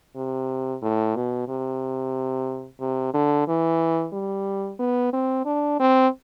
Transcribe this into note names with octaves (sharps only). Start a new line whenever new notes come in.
C3
A2
B2
C3
C3
D3
E3
G3
B3
C4
D4
C4